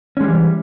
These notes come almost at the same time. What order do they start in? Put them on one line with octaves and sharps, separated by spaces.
C#4 G#3 G3 E3